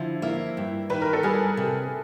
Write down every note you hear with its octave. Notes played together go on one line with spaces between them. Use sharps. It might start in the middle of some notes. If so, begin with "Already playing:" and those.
Already playing: D3 F3 E4
A#3 E4
G2
D#3 B4
A#4
A4
G3 G#4 A#4
C3